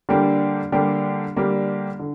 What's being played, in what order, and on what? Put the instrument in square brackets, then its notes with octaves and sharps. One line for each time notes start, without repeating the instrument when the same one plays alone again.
[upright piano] D3 G3 A#3 D4 G4
D3 G3 A#3 D4 G4
D3 G3 A#3 D4 G4
D3